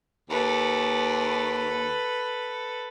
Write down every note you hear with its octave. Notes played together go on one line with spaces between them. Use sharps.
D#2 A4 B4